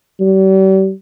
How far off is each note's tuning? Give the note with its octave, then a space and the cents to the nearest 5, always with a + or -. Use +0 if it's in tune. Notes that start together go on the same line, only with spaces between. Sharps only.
G3 -40